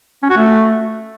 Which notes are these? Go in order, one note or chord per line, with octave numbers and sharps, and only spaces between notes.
C#4
F#4
A3